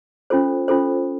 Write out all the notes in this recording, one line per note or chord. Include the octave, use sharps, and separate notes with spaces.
C#4 F4 A4 C5
C#4 F4 A4 C5